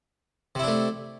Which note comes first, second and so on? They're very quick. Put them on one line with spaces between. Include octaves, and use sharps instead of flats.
C3 E4 D4 A3